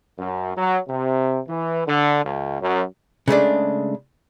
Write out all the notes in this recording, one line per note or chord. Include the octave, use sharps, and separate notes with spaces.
F#2
F#3
C3
E3
D3
C#2
F#2
C#3 G#3 A3 D4